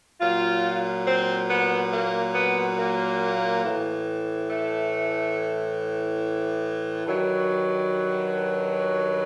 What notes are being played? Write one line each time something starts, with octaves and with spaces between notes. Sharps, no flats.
A#2 F#3 F4
C4
B3
A#3
B3
A#3
A2 E3
A3
G2 D#3 F#3